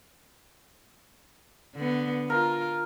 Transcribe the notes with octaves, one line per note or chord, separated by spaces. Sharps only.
D3 B3
F4 A#4